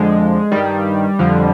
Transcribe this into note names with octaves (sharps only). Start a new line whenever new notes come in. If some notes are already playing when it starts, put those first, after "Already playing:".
Already playing: F2 D3 F3 G#3
G2 D#3 G3
F2 D3 F3